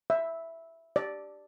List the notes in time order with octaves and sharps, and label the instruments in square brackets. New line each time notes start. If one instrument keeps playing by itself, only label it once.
[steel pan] E5
D5